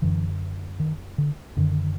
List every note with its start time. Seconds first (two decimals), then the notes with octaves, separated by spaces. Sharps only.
0.02 F#2 D3 E3
0.80 D#3
1.18 D3
1.57 F#2 D3 D#3